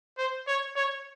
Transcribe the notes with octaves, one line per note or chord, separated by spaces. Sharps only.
C5
C#5
C#5